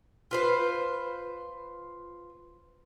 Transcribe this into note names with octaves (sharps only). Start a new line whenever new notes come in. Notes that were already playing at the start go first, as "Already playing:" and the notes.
F4 B4 C5